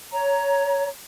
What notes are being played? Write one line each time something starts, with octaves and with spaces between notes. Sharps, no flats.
C#5 A#5